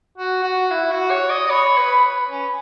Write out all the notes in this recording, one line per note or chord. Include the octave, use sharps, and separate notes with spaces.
F#4
F#4
E4
F#4
C#5
D#5
D#5
C#5 B5
B4
C#4